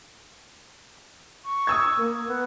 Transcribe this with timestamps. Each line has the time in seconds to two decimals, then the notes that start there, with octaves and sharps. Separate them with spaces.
1.45 C#6
1.67 D#6 E6 G#6
1.97 A#3
2.27 B3